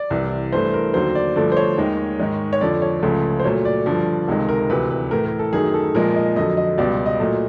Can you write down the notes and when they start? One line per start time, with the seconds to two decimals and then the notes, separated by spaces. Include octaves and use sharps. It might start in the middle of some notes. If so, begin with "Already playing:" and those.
Already playing: D5
0.10 C2 C3 E3
0.53 G2 E3 A3 C5
0.74 A#4
0.94 D#2 D3 F#3 C5
1.15 D5
1.36 G2 D3 F3 A3 D5
1.52 C5
1.57 C#5
1.78 D#2 D#3 G#3
2.19 G#2 D#3 G#3
2.53 C#5
2.61 F2 D3 F3 D5
2.82 C#5
3.02 C#2 C#3 F3 A3
3.40 C5
3.44 A#2 F#3 A3 C#5
3.65 D5
3.86 G2 D3 F3
4.27 C#2 C3 D#3 G#3 A4
4.49 A#4
4.69 D2 C3 E3 B4
4.90 B4
5.11 A2 E3 A3 A#4
5.25 A#4
5.39 A4
5.53 F#2 D#3 F#3 A3 G#4
5.74 A4
5.95 A#2 F3 G#3 A#4
6.16 D#5
6.36 F2 D3 F#3 D#5
6.57 D#5
6.78 C#2 B2 G3 D5
7.06 D#5
7.20 A#2 F#3 A3